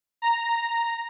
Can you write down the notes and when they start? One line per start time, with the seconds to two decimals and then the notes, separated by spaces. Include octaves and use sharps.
0.22 A#5